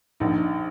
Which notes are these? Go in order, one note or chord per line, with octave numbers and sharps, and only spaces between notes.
A#1 D#4